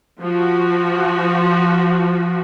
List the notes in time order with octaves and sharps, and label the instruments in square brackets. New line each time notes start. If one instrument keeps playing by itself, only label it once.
[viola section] F3 F#4